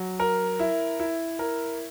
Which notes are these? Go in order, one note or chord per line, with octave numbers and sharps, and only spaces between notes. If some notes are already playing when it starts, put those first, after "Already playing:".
Already playing: F#3
A#4
E4
E4
A#4